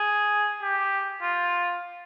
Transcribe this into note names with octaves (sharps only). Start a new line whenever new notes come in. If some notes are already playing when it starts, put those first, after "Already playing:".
Already playing: G#4
G4
F4